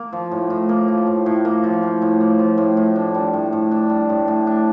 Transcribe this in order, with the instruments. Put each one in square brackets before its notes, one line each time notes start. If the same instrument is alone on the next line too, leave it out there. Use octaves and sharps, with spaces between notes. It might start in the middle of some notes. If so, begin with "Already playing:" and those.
Already playing: [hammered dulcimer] A#3
F3
A2
A2
A#3
F3
A2
A2
A#3
F3
A2
A2
A#3
F3
A2
A2
D4
G3
A2
A2
D4
G3
A2
A2
D4